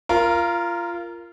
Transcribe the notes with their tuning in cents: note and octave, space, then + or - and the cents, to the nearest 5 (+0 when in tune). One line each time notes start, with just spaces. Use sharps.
F4 -20 A#4 +0